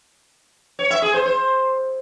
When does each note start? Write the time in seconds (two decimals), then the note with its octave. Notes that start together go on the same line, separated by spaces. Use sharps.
0.79 C#5
0.90 E5
1.02 G#4
1.14 C5
1.26 C5